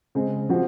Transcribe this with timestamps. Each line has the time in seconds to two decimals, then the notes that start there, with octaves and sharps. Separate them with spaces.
0.15 C#3 G#3 C4
0.49 C#3 F3 C4 F#4